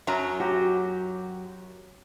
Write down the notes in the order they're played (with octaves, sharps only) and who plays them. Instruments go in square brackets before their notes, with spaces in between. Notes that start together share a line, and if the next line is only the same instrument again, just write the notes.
[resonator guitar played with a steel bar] F#2 F#3 A#5
[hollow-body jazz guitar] F#4 G4